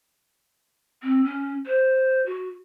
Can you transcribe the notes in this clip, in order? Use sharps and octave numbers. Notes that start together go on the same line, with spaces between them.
C4
C#4
C5
F#4